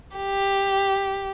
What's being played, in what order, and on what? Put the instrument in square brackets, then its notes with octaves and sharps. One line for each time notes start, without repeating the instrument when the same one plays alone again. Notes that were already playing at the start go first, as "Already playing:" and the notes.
[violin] G4